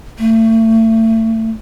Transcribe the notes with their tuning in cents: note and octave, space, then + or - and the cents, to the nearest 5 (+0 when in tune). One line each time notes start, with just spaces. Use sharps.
A3 +30